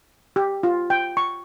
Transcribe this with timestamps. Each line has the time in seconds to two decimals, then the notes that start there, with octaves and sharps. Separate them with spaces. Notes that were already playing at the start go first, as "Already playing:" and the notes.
0.36 G4
0.63 F4
0.90 G5
1.17 C#6